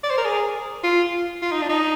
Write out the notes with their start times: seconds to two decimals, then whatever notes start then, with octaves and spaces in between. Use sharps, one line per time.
0.04 D5
0.10 C5
0.17 A#4
0.25 G#4
0.83 F4
1.42 F4
1.52 D#4
1.61 D4
1.69 D#4